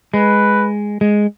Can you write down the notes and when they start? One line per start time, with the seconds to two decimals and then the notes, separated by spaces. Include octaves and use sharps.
0.14 G#3 B4
1.01 G#3